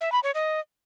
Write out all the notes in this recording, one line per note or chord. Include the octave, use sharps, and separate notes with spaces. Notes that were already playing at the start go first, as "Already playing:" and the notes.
E5
B5
C#5
D#5